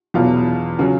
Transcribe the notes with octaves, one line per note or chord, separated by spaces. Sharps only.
E2 B2 F#3 F4
C#3 F#3